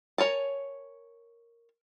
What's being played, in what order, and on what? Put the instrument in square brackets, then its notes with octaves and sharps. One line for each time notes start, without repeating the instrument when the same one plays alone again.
[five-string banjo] A#4 C#5 G#5 A5